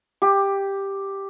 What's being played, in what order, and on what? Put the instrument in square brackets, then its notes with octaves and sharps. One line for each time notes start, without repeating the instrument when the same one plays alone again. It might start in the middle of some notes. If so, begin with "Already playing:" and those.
[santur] G4